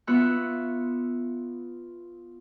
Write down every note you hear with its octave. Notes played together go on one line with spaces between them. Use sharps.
B3 F4 E5 C#6 F#6